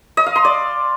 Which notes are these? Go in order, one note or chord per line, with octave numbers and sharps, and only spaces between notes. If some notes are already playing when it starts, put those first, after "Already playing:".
D#5
F5
C6
D5